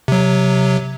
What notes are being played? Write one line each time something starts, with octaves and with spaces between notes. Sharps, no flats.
C3 F#3